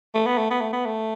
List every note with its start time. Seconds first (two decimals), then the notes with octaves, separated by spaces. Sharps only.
0.14 A3
0.26 B3
0.38 A3
0.50 B3
0.61 A3
0.73 B3
0.86 A3